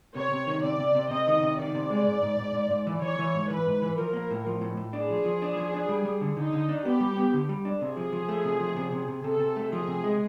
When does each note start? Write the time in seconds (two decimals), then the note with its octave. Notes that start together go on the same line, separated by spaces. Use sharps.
0.15 C3 C#5
0.31 C3
0.47 D#3
0.63 C3 D5
0.79 C3
0.95 C3
1.11 C3 D#5
1.27 D#3
1.42 C3
1.59 D#3 D5
1.75 C3
1.90 G#3
2.07 G#2
2.23 G#2
2.39 G#2
2.55 G#2
2.71 G#2
2.87 E3
3.02 E3 C#5
3.19 E3
3.34 G#2
3.50 E3 B4
3.66 G#2
3.82 E3
3.98 F3 A#4
4.13 A#3
4.31 A2
4.46 F3
4.61 A2
4.77 A2
4.93 D4 G#4
5.10 F3
5.25 F3
5.42 D4
5.57 F3
5.74 D4
5.89 G3
6.05 G3
6.21 D3
6.37 D3 D#4
6.53 D3
6.69 D4
6.85 B3 G4
7.00 G3
7.17 B3
7.33 D3
7.49 G3
7.65 D4
7.81 C3 G#4
7.97 F3
8.13 F3
8.29 A3
8.44 C3
8.60 F3
8.77 C3
8.92 C3
9.08 C3
9.24 C3 A4
9.40 C3
9.56 A3
9.72 F3 G#4
9.87 C3
10.04 G#3